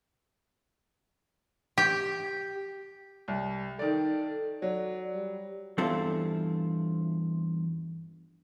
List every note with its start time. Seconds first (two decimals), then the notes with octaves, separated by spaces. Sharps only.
1.78 G4
3.28 C2
3.79 D#3 A4 D5
4.62 F#3 D5
5.14 G3
5.78 E2 G2 C4 E4 F4 A4